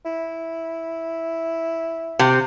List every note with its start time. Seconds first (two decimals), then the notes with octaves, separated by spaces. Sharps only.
0.05 E4
2.19 C3